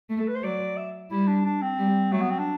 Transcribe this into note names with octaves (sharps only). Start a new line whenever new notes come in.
A3
A4
B4
C5
F#3 D5
E5
G3 E4
D4
D4
C4
G3
F#3 A3
B3
C4
D4